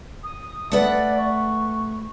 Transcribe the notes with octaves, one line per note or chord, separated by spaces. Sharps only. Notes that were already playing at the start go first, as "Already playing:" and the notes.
D#6
A3 B4 D5 F#5
C#6